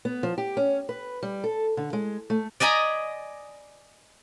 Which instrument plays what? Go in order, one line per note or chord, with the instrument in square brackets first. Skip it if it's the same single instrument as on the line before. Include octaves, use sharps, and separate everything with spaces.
[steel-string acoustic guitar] B3
F3
G4
C#4
B4
G3
A4
D3
G#3
A3
[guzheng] D5 D#5 G#5 A#5 B5